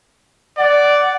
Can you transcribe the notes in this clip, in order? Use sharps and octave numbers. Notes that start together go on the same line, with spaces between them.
D5 F#5